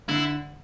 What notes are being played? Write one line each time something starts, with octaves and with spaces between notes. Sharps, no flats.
D3 E4